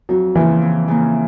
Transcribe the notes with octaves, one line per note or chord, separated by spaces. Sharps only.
F2 F#3
C#3 E3 F3 A#3
F2
C#3 F3 A#3